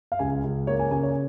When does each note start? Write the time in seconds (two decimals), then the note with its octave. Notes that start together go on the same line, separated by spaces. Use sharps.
0.12 F5
0.19 C#2 G#5
0.44 C#2
0.67 A#3 C#5
0.79 G#5
0.91 C#3 G#5
1.03 C#5